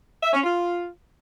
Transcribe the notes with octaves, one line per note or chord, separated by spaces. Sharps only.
E5
C#4
F4